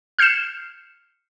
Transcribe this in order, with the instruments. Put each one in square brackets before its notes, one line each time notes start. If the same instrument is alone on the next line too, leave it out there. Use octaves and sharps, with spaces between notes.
[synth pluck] F6 G6 C7 C#7 E7